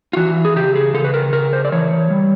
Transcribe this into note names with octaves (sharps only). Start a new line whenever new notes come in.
F4
E3 F#4
G#4
C#3 G4
G#4
C#3 A4
B4
A#4
C#3 A#4
C5
D5
E3 C#5
G3